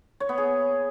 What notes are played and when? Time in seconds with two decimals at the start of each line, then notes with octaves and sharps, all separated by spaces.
0.20 C#5
0.29 B3
0.38 G#4